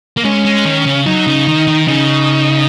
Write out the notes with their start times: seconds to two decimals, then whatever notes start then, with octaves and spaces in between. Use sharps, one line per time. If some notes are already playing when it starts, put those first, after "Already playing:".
0.17 A#3
0.25 G#3 C#4
0.45 G#3
0.65 D#3
0.86 C#3
1.06 F#3 D#4
1.27 C#3
1.47 D#3
1.67 D#3
1.87 C#3 D#4